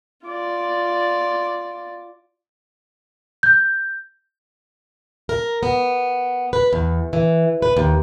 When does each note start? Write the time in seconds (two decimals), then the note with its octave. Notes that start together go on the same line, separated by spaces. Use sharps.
0.25 F4 D5
3.43 G6
5.29 A#4
5.63 B3
6.53 B4
6.73 E2
7.13 E3
7.62 B4
7.77 D#2